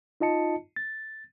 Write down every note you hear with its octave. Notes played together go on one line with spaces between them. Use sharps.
D#4 F4 D#5 A5 C#7
A6